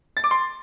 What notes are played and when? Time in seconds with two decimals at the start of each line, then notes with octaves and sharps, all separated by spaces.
0.17 A6
0.24 D6
0.31 C6